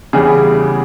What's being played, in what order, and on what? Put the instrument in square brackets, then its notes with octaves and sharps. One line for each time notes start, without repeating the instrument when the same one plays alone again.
[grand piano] E2 C#3 E3 G3 G#4